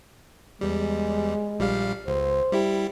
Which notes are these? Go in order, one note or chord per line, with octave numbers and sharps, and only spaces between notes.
E2 G3 G#3
A#1 G3 F5
C#2 C5
G3 E4 G4